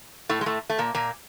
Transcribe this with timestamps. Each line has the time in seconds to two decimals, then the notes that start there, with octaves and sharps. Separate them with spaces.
0.29 A2 A3
0.41 G#3
0.46 A2 A3
0.70 A3
0.78 A#2 A#3
0.95 A#2 A#3